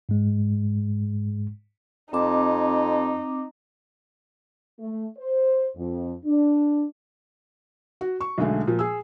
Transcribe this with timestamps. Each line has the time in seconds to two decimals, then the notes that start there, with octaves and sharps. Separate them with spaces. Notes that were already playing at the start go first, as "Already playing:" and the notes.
0.09 G#2 G#3
2.13 F2 C4 D#4 D6
4.79 A3
5.18 C5
5.77 F2
6.25 D4
8.01 F#4
8.21 C#6
8.38 B1 D3 G#3 A3
8.67 A#2 F3
8.79 G#4 E6